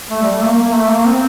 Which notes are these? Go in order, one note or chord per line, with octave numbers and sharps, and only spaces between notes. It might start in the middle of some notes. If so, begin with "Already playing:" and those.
A3
G3
A3
A#3
A#3
A#3
A3
A#3
C4